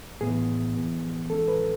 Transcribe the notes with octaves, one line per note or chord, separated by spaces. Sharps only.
A2 E3 B3 G#4
E3 B3
E3 G#3 C#4 A4
B4